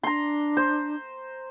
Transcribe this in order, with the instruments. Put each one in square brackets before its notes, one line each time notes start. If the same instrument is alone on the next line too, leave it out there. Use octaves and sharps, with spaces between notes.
[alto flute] D4 [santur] A#5 C6
[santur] C5